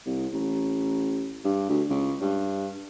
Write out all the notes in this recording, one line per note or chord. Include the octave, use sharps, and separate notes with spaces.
C2
A1
G2
D2
C#2
G2